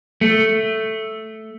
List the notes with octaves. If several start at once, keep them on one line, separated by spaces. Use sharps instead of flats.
A3